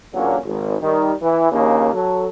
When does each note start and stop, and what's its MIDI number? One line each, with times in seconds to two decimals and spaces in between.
0.14 0.37 40
0.14 0.37 46
0.14 0.37 50
0.14 0.37 54
0.14 0.37 58
0.14 0.37 61
0.46 0.76 32
0.82 1.12 51
0.82 1.12 55
1.22 1.47 52
1.52 1.89 34
1.52 1.89 39
1.52 1.89 49
1.52 1.89 58
1.94 2.26 54
1.94 2.26 69